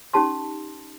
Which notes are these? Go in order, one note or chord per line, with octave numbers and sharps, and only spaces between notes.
C#4 D#4 G4 A5 C6